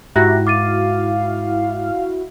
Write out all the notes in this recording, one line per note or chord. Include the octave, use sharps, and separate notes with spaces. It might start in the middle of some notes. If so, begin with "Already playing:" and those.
G#2 E4 F#4 G4 A#5 F#6 A#6
F5 D6 A6 D#7